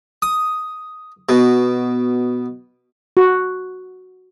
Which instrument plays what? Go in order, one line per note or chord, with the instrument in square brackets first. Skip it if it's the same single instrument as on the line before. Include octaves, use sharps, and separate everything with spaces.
[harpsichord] D#6
B2
[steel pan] F#4